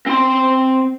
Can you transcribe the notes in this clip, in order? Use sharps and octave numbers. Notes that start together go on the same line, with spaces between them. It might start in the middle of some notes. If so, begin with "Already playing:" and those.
C4 C6